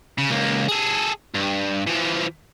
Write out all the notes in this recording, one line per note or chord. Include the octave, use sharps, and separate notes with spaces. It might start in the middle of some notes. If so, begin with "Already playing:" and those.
C#3
C#2 A#3
G#4 A4
G2
E3 F3